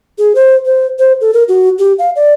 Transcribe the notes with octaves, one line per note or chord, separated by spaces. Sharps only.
G#4
C5
C5
C5
A4
A#4
F#4
G4
F5
D5